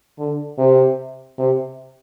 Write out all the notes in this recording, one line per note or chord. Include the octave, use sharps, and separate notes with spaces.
D3
C3
C3